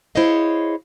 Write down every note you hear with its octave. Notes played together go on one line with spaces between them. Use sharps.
E4 G#4 C5 C#5 D#5 F5